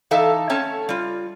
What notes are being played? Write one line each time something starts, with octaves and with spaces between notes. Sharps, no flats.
E3 D#4 A4 E5 F5 A5
A3 C4 C#4 C#5 A5
G3 F4